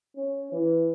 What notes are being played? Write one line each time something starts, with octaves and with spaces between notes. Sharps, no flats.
C#4
E3